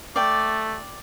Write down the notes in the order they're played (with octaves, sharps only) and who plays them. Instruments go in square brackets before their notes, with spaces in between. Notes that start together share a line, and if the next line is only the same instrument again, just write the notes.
[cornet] A3 [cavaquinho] D5 G5